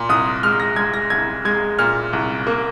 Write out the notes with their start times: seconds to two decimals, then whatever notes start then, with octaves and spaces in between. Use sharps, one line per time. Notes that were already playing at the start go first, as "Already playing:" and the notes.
Already playing: A#2 C6
0.09 C2 D#6
0.43 G#3 F6
0.60 A#6
0.76 G#3 G#6
0.94 A#6
1.10 C2 G#6
1.45 G#3 G#6
1.79 A#2 F6
2.13 C2
2.47 A#3